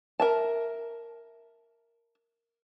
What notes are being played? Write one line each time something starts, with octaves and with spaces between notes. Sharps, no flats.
A#4 E5 A5